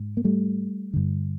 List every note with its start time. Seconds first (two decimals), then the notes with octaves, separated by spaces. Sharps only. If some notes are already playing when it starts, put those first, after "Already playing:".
Already playing: G#2
0.17 A#3
0.25 G3 A3
0.93 G2 D3